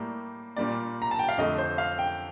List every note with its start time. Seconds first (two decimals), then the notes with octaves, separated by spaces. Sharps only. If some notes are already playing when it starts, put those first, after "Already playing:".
Already playing: A2 G3 A#3
0.56 A#2 G3 A#3 D5
1.02 A#5
1.11 A5
1.19 G5
1.29 F5
1.38 F2 D3 A3 D#5
1.58 C5
1.78 F5
1.99 G5